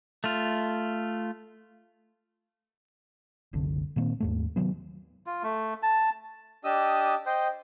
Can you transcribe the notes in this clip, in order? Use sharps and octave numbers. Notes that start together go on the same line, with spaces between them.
A3 F4
F#1 C2 D3
A#2 D#3 A#3 C4
D#2 G#2 A3
C3 D#3 F#3 B3
F4
A3
A5
D4 G4 D#5 D#6 E6
C5 D#5 G5